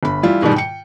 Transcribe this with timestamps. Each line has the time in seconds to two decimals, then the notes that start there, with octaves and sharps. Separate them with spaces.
0.03 G1 B5
0.23 E3 G3 E4 F4
0.42 G#2 B2 D#3 E3 G3
0.56 G5 C#7